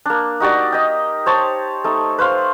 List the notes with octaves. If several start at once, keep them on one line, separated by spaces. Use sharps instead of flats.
A#3 D4
D#4 F#4 G4 D5
D#5 G5
C5 C#5 A5
A3 D#4
B4 C5 F5 C6